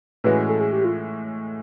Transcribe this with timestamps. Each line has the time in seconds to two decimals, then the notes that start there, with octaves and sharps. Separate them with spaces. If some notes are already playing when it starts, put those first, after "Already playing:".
0.24 A2 E3 G#3 C#4 F#4 B4
0.49 A4
0.61 G#4
0.73 G4
0.85 F4